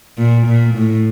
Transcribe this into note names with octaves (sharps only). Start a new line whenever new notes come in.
A#2
A#2
A2